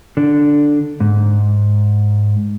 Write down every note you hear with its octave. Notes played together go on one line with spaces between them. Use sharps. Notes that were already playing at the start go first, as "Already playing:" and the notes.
D3 D4
G#2